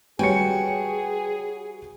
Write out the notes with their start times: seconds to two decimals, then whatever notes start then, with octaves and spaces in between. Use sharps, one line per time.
0.19 G3 F#4 G#4 B4 C#5 G5 G#5 C#7